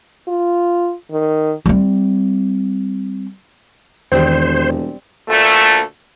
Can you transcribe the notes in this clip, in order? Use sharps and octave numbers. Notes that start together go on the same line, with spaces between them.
F4
D#3
G3 C4
E1 E2 D#3 G3 C4 C5
D2 A#2 A3